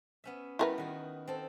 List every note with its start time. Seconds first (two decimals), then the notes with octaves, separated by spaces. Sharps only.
0.24 B3 C#4 E5
0.59 G3 B3 E4 F#4 A#4 B4
0.78 D#3 F#4
1.27 C4 A4